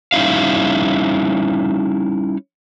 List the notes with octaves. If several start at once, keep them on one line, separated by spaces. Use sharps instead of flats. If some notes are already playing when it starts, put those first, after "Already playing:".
G3 C#4 D#4 E4 F5